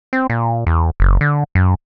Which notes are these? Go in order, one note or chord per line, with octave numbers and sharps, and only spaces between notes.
C4
A#2
E2
F#1
D3
F#2